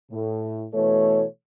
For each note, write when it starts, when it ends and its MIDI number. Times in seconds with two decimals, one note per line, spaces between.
0.12 0.66 45
0.74 1.23 47
0.74 1.23 52
0.74 1.23 57
0.74 1.23 69
0.74 1.23 73